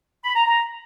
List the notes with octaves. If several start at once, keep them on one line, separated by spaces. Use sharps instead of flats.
B5
A#5
A#5